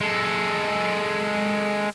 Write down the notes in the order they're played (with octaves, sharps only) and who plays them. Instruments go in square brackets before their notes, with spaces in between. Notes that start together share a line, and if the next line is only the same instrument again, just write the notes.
[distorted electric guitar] G#3 A4